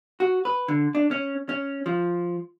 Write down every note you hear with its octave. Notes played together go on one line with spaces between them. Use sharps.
F#4
B4
D3
D4
C#4
C#4
F3